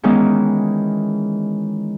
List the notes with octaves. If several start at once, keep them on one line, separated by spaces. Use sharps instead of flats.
D#3 E3 G#3 B3 C#4 D#4